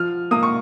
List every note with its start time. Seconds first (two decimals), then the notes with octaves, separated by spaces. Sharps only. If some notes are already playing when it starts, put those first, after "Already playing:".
Already playing: F3 F6
0.31 A#3 D#6
0.43 C#6